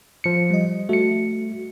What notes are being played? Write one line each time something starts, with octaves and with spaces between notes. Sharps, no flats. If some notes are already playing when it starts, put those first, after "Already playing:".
F3 C#7
G3 D#5
A3 F#4 C#7